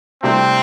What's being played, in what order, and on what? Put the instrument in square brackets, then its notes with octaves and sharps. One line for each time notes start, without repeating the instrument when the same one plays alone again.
[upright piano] C2 C3 A3 D4 [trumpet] C4